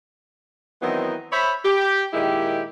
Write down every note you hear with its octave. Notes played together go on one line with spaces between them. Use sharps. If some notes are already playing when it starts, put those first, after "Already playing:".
D#3 E3 F#3 B3 C4 D#4
C5 C#5 E5 B5
G4
A#2 D#3 G#3 E4 G4